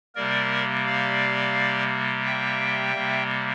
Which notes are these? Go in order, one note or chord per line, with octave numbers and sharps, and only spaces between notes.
C3 G3 A#3 A#4 D5
D5 F5
E5 G5
C3 G3 A#3